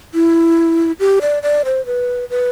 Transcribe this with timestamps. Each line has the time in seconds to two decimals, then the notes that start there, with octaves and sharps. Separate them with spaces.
0.14 E4
1.00 G4
1.21 D5
1.43 D5
1.65 C5
1.86 B4
2.30 B4